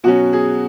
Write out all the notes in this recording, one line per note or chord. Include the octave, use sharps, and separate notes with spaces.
B2 F#3 C#4 F#4
G#4